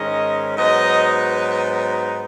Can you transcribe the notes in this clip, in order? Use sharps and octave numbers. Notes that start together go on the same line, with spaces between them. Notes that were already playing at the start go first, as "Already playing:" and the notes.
Already playing: G#2 D#3 G#3 C#4 D#5
G#2 F#3 B3 D#4 D#5